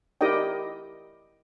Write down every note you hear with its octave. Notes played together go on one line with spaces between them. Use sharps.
E4 G4 A#4 D5 D#5 G5